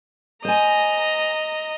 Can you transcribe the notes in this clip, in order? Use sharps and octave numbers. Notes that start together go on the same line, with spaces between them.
C5 D#5 G#5 A#5